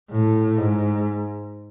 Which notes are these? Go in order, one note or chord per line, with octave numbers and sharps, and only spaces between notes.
A2
G#2